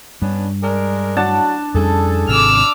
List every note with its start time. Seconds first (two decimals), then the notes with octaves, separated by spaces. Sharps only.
0.22 G2 G3 B3 C#4 D4
0.63 G#3 D4 A#4
1.17 F#3 D4 F#5 A5
1.74 F2 A2 G3 C#4 G#4 A4
2.29 G#1 C3 D6 E6 F6